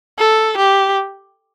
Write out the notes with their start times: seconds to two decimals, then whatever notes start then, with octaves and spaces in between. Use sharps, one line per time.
0.18 A4
0.57 G4